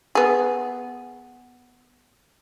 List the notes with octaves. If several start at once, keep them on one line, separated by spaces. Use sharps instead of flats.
B3 G#4